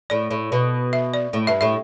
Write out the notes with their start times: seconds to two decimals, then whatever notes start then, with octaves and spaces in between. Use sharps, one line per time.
0.10 A2 D5
0.31 A2
0.52 B2
0.93 E5
1.14 D5
1.33 A2
1.47 G2 E5
1.61 A2 E5